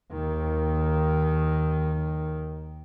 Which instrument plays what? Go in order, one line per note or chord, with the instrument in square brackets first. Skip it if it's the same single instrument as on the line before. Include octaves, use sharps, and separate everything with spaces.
[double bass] D#2 D#3